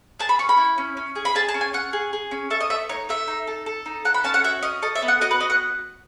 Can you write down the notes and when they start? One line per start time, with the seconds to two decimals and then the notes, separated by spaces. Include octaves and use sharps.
0.20 G#4 A5
0.29 B5
0.39 C#4 C#6
0.49 B5
0.57 E4
0.78 C#4
0.97 C#4
1.16 G#4
1.25 B5
1.35 G#4 A5
1.49 A5
1.54 C#4
1.61 G#5
1.73 C#4 F#5
1.93 G#4
2.13 G#4
2.31 C#4
2.50 A4 E5
2.61 D#5
2.70 A3 E5
2.89 D#4 C#5
3.09 A3 E5
3.28 D#4
3.47 A4
3.66 A4
3.86 D#4
4.05 A4 F#5
4.14 B5
4.24 C#4 A5
4.34 F#5
4.44 F#4 E5
4.63 C#4 D#5
4.82 A4 D#5
4.95 E5
5.02 B3
5.08 F#5
5.21 F#4 D#5
5.31 B4
5.40 B3 D#5
5.50 F#5